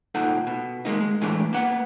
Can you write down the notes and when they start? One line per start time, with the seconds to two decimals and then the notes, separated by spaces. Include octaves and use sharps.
0.15 A#2 D#4 A4 F#5
0.47 B2
0.85 D#2 G#3 A#3 D#4
1.00 G#3
1.21 A2 E3 G#3 A3 D4
1.53 A#3 B3 F#5